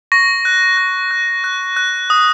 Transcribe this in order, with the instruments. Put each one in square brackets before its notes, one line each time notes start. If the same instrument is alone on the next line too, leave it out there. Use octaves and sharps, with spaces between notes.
[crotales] C#6 A#6
F#6
F#6
F#6
F#6
F#6
D#6